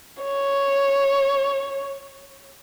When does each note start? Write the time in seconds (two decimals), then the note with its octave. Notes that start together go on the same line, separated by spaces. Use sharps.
0.23 C#5